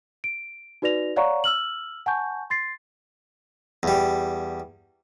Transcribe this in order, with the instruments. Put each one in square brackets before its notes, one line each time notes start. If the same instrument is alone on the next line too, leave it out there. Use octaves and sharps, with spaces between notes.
[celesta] D7
D#4 F#4 B4 D5 A#6 F7
C#5 D5 F5 F#5 A#5 C#6
E6 F6 F#7
F#5 G#5 A5 C#6 G6
C6 A6 C7
[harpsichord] E2 G3